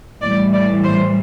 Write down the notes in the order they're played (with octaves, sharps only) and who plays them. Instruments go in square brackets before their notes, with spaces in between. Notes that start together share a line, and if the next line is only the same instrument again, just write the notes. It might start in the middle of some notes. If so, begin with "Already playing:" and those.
[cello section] A2 E3 G3 D5
D5
C5